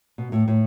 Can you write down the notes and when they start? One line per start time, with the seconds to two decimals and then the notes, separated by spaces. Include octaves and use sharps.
0.18 B2
0.32 A2
0.48 A2